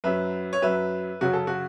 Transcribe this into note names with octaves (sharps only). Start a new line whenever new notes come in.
F#2 F#3 B4 E5
C#5
F#2 F#3 B4 E5
F#2 C#3 F#3 F#4
A4
F#4